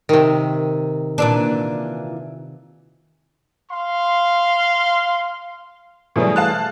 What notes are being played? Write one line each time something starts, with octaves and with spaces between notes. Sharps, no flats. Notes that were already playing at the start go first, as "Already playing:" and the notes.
C3 D#3
A#2 E3 D4
F5 C6
B2 E3 F#3 G3 A3 G#4
F5 A5 F#6